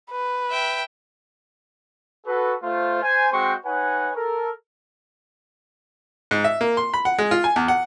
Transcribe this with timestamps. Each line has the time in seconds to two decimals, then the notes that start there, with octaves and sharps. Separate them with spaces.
0.11 B4
0.50 E5 G5
2.26 F#4 A4 B4
2.63 A3 F4 C5
3.02 C5 G#5
3.32 G#3 C4 F#4 C5 G5 C#6
3.65 D#4 B4 C#5 F#5 G#5
4.16 A4 A#4
6.31 G#2
6.44 E5
6.61 A#3
6.77 C6
6.94 B5
7.05 F#5
7.19 G#3
7.31 F4
7.44 G#5
7.56 E2
7.68 F#5